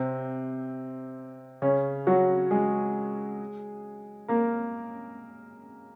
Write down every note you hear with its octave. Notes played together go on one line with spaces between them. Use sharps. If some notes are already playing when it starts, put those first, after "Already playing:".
Already playing: C3 C4
C#3 C#4
F#3 F#4
G#3 G#4
A#3 A#4